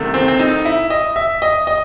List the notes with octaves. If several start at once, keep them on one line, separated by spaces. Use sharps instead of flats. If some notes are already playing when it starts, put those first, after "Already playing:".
Already playing: C2 C3 D#3 A3
C4
C4
D#4
E4
D#5
E5
D#5
D#5